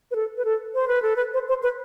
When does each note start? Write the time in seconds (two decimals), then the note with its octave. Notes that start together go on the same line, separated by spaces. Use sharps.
0.11 B4
0.16 A4
0.37 B4
0.45 A4
0.74 C5
0.88 B4
1.02 A4
1.16 B4
1.34 C5
1.49 C5
1.63 B4